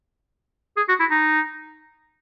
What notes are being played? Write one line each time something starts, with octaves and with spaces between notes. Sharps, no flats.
G#4
F#4
E4
D#4